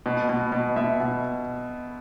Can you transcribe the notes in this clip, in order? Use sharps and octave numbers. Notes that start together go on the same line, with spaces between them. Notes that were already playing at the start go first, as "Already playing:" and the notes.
B2
B2
B2
B2 E5
B2